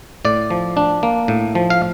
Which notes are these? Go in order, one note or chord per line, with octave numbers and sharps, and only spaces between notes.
A2 D5
F3
D4
A#3
A2
F3
F5